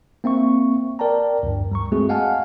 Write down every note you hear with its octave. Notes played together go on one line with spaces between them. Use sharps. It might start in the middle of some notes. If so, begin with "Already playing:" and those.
A#3 C4 E5 C#6
A#4 D5 G5 A5 A#5
D2 G2
G3 A#5 C#6
G#3 A3 C4 F#4 G#4
D#5 F5 F#5 G#5 A5 F6